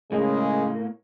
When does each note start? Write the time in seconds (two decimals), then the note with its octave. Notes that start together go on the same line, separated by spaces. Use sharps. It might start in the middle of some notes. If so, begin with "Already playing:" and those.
0.12 A2 C#3 G#3 A#3